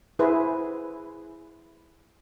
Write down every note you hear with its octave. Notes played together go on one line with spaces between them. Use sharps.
E4 G#4 B4 C5